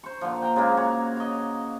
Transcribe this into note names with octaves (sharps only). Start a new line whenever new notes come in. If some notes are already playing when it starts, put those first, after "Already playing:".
C5 C#6
A#2 D3 F3
G5 A#5
C#3 G#3 A#3
F#4 C#5
C#5 D#5